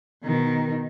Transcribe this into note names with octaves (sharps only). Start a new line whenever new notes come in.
B2 D#3